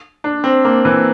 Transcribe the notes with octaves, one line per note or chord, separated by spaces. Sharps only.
D4
C4
A#3
E3